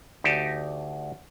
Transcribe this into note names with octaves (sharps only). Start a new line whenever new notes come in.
D2 D#4 G4 A5